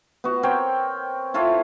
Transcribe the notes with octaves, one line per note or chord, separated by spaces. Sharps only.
B3 F#4
C4 A#4 C#5 G5
E4 F4 A4 C#5